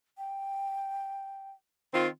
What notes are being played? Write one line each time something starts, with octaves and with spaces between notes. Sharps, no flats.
G5
D#3 C4 F4